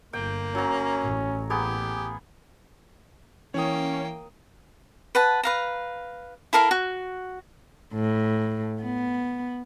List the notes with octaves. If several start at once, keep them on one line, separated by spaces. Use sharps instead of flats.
G1 A#3 G5
F#3 C#4 A#5
A1
A#3 B3 G4 G#4
E3 A#3 C#4 C#5 G5 D#6
B4 F#5 A5
B4 F5 A#5
E4 A4 A#4 F5
F#4
A2
B3